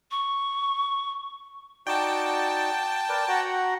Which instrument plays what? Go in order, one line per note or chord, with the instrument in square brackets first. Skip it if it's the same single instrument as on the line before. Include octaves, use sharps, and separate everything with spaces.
[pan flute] C#6
[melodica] D#4 F#4 D5 [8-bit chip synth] G5 A5
[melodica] A#4 B4 D5
F#4 F#5 A#5